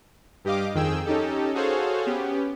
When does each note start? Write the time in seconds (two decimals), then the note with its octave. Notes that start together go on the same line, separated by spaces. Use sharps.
0.44 G2 G4 D#5 F5 D6
0.74 F2 D#3 G#4 G5 E6
1.06 C#4 D#4 G4 A4
1.54 F#4 G#4 A4 C5 C#5 F5
2.06 B3 C#4 G4